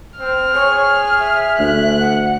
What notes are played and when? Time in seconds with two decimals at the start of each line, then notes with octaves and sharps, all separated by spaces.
0.19 C4 F6
0.54 G#4 C#5
1.20 E5
1.59 D2 F#6
2.00 F#5